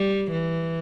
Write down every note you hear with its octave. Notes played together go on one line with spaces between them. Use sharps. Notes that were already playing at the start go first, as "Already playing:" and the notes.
Already playing: G3
E3